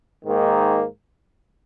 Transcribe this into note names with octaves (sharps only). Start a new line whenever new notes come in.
G#2 D#3 A#3